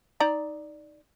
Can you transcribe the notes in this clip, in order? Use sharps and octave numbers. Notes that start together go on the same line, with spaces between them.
D#4 D5 A#5